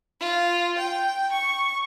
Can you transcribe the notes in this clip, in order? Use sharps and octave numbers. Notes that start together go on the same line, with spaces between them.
F4
G5
C#6